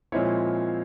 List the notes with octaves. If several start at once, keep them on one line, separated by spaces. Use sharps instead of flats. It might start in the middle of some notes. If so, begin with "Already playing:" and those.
A#2 F3 G#3 C4 E4 C#5